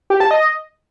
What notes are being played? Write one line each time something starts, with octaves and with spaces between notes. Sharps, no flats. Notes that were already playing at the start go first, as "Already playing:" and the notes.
G4
A5
D#5